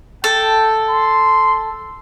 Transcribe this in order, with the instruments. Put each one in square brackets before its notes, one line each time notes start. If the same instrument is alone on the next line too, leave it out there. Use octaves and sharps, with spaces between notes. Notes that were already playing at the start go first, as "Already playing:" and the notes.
[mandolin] A4 [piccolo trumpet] G5
[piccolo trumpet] C6